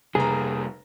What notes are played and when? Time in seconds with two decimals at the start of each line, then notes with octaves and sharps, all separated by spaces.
0.15 F1 G3 A#3 G#4 A#5